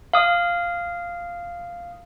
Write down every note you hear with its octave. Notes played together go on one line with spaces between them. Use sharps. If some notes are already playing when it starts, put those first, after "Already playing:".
F5 D#6